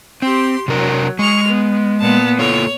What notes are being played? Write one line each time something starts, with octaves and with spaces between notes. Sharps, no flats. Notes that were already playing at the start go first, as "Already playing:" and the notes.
C4 G4 C6
C3 F#3 D4 A#4
G#3 C#6 F6
B3
A#2 B3 A5
A#3 F4 A4 C#5